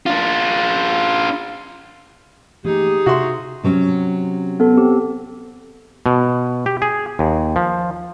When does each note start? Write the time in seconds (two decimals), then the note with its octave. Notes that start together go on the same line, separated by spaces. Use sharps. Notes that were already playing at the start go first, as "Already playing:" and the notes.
0.06 D4 F4
2.65 E3 A3 A#3 D#4 G4 G#4
3.06 C3 F#4 E5 C6
3.63 C3 F#3 C#4
4.60 B3 A4
4.77 C4 G4
6.06 B2
6.66 G4
6.82 G#4
7.19 D#2
7.56 F3